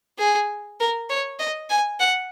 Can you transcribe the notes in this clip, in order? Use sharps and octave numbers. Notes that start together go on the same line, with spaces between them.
G#4
A#4
C#5
D#5
G#5
F#5